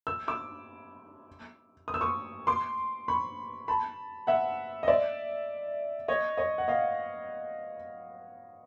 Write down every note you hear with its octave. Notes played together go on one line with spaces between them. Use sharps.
E6
D6 E6
D#6
E6
C#6 D#6
C6 D6
B5 C#6
A5 B5
E5 F#5
D#5
D5 E5
C#5 D#5
C#5 D#5
F#5
D#5 F5